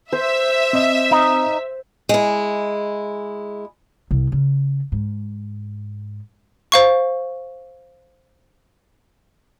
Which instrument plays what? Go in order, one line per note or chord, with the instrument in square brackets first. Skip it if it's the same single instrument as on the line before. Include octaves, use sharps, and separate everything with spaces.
[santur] C5 [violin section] E5
[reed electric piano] C4 D#5
[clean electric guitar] D#4
[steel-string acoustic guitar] G#3 E4
[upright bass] C2
C#3
G#2
[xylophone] C5 F5 C#6